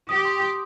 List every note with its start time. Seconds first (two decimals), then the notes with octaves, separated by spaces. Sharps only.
0.09 G4 D#6
0.25 C6
0.41 C6